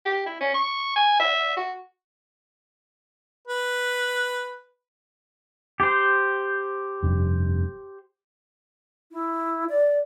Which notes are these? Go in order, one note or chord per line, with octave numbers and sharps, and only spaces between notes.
G4
E4
C#4
C#6
G#5
E5
F#4
B4
G4 C5
F1 G2
E4
D5